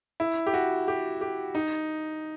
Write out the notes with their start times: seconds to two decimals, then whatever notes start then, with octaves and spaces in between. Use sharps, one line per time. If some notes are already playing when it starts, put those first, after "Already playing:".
0.20 E4
0.47 G4
0.54 F#4
0.88 G4
1.21 G4
1.55 D#4